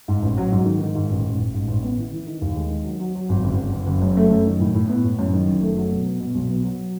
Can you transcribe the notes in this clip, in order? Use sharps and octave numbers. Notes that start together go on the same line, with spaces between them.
G#2
A1
F#3
G#2
D#3
D#3
G#2
A1
A1
A1
G#2
A1
B3
E3
E3
D#3
D#2
G#3
D#3
F#3
F#3
F#3
G#1
F#1
F#1
F#1
F#1
F#2
A3
F#2
D#3
A2
A2
B3
A2
F#2
D#3
F#1
A3
F#3
B2
B3
B2
B1
B3
F#3